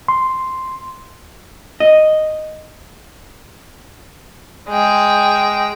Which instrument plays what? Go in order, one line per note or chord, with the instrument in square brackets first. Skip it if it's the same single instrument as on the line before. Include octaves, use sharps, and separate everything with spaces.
[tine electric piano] C6
[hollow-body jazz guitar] D#5
[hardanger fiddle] G#3 G5